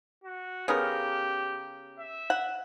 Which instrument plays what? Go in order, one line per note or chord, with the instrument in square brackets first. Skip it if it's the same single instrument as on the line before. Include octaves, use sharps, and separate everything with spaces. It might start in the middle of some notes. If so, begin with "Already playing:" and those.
[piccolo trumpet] F#4
[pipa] C#3 B3 A#4 [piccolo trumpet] G4
[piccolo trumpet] E5
[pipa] F#5